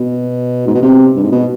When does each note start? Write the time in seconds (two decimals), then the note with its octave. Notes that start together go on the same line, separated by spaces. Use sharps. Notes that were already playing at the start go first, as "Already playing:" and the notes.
Already playing: B2
0.67 G#2
0.75 B2
0.82 C3
1.16 G2
1.23 G#2
1.32 B2